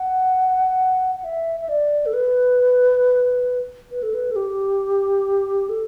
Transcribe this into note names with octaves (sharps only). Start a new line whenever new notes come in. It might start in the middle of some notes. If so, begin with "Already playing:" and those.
Already playing: F#5
F#5
E5
E5
D5
A4
B4
B4
A4
B4
A4
G4
A4